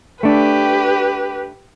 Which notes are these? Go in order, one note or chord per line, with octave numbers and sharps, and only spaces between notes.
A3 D4 G4 B4